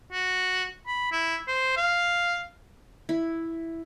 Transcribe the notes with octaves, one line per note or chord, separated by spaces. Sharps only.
F#4
B5
E4
C5
F5
E4